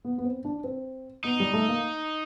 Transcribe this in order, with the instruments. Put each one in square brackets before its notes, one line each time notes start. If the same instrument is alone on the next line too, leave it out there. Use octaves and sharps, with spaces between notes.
[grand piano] B3
B3
C4
D4
C4
[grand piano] B3 [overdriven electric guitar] D#4
[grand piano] G3
A3
A#3